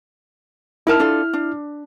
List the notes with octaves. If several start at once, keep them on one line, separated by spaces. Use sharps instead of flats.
D#4 E4 A#4 A5 F6
D4 F4 A4
D4